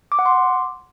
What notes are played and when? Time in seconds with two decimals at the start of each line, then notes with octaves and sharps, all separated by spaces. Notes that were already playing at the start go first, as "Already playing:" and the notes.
0.12 D6
0.19 F#5
0.26 C6
0.33 D6